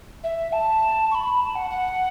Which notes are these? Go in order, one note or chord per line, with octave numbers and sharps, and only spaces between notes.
E5
A5
C#6
B5
A5
F#5
F#5